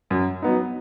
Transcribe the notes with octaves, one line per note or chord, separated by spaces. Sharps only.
F#2
F#3 B3 D#4